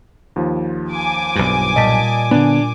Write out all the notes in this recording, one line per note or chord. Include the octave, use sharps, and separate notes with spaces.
D#2 F3
G#5 D6
B1 G2
A#2 G3 D#5 A5 B6
D3 B3 D4